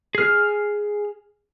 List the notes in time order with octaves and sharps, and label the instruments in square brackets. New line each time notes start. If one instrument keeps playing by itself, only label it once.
[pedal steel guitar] G#4 F6